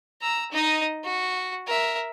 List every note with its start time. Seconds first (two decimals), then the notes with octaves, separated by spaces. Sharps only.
0.22 A#5 E6
0.52 D#4 D#5
1.04 F#4
1.67 A#4 E5